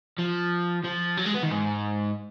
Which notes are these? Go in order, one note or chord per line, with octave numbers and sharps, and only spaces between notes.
F3
F3
F#3
G#3
B3
D#3
G#2